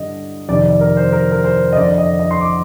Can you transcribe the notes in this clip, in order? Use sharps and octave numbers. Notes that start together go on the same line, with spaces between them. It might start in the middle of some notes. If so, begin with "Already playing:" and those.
Already playing: G2 D3 D#5
F2 C3 D#3 D5
D5
A#4
C5
A#4
A#4
C5
D#5
F2 D3 D5
D#5
D#5
C6
D6